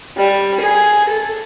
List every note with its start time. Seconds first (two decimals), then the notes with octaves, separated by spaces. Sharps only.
0.17 G3
0.60 G#4
1.08 A4